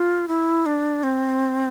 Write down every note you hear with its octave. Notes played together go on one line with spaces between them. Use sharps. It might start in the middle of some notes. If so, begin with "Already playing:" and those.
Already playing: F4
E4
D4
C4